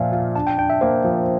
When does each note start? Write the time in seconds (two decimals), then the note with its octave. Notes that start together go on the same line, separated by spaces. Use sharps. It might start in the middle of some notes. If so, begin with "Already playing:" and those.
Already playing: A#2 F3 F4 D5 E5 F5
0.12 F4
0.36 D4 A5
0.47 G5
0.58 D4 G5
0.70 E5
0.81 A#3 C5
1.04 F3